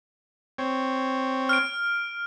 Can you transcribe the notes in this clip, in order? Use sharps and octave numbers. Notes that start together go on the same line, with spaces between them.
C4 C#5
F6 D7